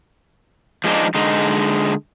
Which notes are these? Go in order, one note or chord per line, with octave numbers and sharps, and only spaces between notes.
F3 G#3 B3 D4 D#4
D3 G#3 D#4